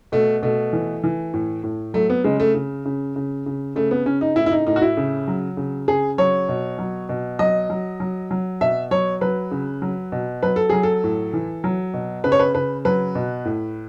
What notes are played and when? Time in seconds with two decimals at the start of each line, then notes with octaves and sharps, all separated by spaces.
0.12 B2 A3
0.43 B2 A3
0.73 E3
1.04 E3
1.34 A2
1.64 A2
1.94 F#3 A3
2.10 B3
2.24 C#3 G#3
2.40 A3
2.54 C#3
2.86 C#3
3.16 C#3
3.46 C#3
3.76 C#3 A3
3.91 B3
4.06 C#3 C#4
4.21 D#4
4.36 A2 E4
4.46 E4
4.52 D#4
4.67 A2 D#4
4.76 F#4
4.82 E4
4.97 C#3
5.28 F#3
5.57 C#3
5.88 C#3 G#4
6.18 F#3 C#5
6.49 B2
6.78 F#3
7.09 B2
7.39 F#3 D#5
7.70 F#3
8.00 F#3
8.31 F#3
8.61 B2 E5
8.91 F#3 C#5
9.21 F#3 B4
9.51 C#3
9.82 F#3
10.12 B2
10.43 F#3 B4
10.56 A4
10.70 F#3 G#4
10.83 A4
11.04 A2
11.33 E3
11.64 F#3
11.94 B2
12.24 C#3 B4
12.32 C#5
12.39 B4
12.54 C#3 B4
12.85 F#3 B4
13.15 B2
13.45 A2